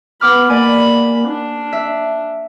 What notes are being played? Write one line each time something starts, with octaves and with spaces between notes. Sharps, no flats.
B3 F#5 B5 D6 F6
A#3 D5 G#5 B5
D4
E5